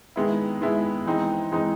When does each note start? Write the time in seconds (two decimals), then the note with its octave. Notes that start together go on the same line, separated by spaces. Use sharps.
0.16 D#3 G#3 B3 E4
0.61 D#3 G#3 B3 E4
1.06 E3 G#3 C4 D#4
1.51 E3 G#3 C4 D#4